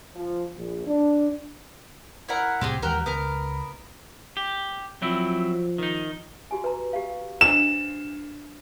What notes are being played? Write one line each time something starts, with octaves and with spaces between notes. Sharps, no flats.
F3
A#1
D4
E4 A#4 F#5
C2 A2 C4 G4 G#4
D#2 E3 G#3 F#4 G4 A#4
C#2 B3 A#4
G4
F3 F#3 C4 E4
D#3 D#4
F#4 G4 G#5
B4 A#5
G4 F5
D4 C5 E7